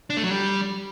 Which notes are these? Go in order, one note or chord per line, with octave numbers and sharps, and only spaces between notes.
D4
A3
F#3
G3